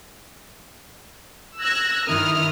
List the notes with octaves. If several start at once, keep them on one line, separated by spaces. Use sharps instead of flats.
E6 F#6 G#6 A#6
G2 D#3 E4 A#4 D#6 F6